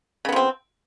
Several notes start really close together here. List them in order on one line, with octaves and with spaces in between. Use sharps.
C#3 B3 F3 C4